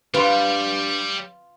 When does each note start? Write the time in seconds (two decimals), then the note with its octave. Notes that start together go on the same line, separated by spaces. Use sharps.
0.14 G2 G3 F4 B4 C6